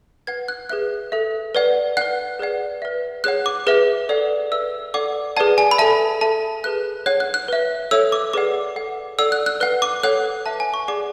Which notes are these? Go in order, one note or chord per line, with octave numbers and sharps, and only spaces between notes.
B4 F#5 G#6
F#6
G#4 B4 E5 F#6
A4 E5
B4 D5 F#5
B4 F#5 F#6
G#4 B4 D5 F#5
B4 E5
G#4 C#5 F#5 F#6
D6
G#4 B4 E5
A4 D5 F#5
B4 E5 E6
A4 D5 F#5 D6
G#4 B4 D5 F#5 A5
G#5
B5
A4 E5 A5
A4 E5 A5
G#4 B4 E5 F#6
G#4 C#5 F#5 F#6
F#6
F#6
B4 E5
A4 C#5 E5 E6
D6
G#4 B4 D5 F#5 D6
A4 D5 F#5
A4 D5 F#5 E6
F#6
F#6
B4 F#5 F#6
D6
A4 C#5 F#5 F#6
B4 E5 A5
G#5
C#6
G#4 D5 F#5 D6